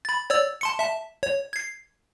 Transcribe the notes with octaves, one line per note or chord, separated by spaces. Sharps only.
B5 A6
C#5 D5 E6
A5 C6 C#7
E5 A5
C#5
G#6 C7